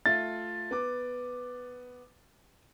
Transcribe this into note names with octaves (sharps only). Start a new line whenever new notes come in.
A3 F4 A6
B3 D6